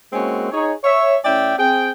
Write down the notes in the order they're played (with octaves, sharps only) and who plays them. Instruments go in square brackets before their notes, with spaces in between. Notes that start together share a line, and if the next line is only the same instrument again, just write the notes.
[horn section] G#3 A#3 C4 C#4 E4 F#4
D#4 G#4 C#5
C#5 E5
A2 C#4 D5 E5 G5
C4 G#4 G5